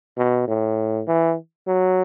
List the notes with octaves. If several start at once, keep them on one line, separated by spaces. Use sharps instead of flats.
B2
A2
E3
F#3